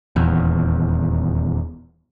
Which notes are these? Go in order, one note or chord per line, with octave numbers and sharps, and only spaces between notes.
D#1 E2